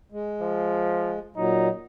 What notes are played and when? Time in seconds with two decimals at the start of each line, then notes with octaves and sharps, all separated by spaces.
0.12 G#3
0.42 F3
1.36 A#2 F#3 D#4